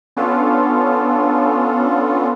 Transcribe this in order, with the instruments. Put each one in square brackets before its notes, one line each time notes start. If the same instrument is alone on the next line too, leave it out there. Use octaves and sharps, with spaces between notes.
[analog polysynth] B3 C#4 D4 F4 A4